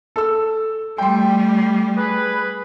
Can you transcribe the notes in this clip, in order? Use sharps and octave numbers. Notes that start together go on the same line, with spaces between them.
A4 E6
G3 A3 G5 C6
G#4 B4